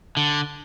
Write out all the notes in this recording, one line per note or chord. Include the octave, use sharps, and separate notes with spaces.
D3